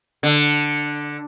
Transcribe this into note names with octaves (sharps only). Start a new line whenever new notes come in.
D3